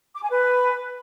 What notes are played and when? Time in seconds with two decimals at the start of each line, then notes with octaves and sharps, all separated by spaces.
0.14 D6
0.21 G#5
0.29 B4